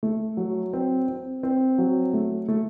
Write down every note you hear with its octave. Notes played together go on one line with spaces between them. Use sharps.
A3
F#3
C4
C4
C4
F#3
A3
A3